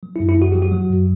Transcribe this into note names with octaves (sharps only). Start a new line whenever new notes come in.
F#3
E4
F#2
E4
F#2 F#4
F#3 G4
F#4
F#3
F#2